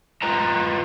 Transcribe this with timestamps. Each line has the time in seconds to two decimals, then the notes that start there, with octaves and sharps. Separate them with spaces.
0.22 F4 B4 D#5 G5 A#5